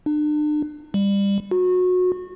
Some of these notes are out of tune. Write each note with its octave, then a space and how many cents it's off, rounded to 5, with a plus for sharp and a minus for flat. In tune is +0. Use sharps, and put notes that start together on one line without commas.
D4 +40
G3 +25
F#4 -25